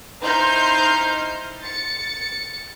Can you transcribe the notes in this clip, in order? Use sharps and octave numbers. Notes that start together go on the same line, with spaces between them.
D#4 E4 C5 C6 F6 G6
A6 C#7